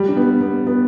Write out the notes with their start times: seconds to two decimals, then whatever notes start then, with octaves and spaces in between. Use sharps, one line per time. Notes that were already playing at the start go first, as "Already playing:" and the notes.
Already playing: G3
0.08 D4
0.17 B3
0.41 B3
0.67 B3